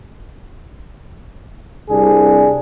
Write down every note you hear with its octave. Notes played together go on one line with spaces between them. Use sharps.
C2 C3 D4 G#4